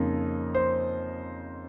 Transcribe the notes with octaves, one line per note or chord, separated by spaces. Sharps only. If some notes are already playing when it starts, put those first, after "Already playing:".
Already playing: F2 C#3 A#3 D#4
C5